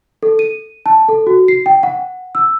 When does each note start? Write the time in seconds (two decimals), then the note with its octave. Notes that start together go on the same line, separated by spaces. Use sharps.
0.23 A4
0.39 D#7
0.86 A5
1.09 A4
1.27 F#4
1.48 C7
1.66 G5
1.83 F#5
2.35 E6